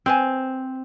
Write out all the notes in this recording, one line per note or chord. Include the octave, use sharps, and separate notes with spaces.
C4 B4 C5 G#5